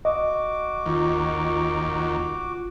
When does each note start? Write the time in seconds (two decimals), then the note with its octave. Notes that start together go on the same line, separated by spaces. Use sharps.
0.05 F#4 D#5 D6
0.86 D#2 F4